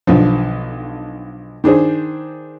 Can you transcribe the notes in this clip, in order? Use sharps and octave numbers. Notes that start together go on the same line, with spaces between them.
B1 D3 F3
D#3 D4 G#4 C5